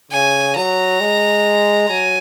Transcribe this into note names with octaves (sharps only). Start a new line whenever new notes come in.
C#3 G#5
F#3 A#5
G#3
F#3 G#5